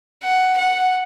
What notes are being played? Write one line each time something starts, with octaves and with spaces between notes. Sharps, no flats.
F#5
F#5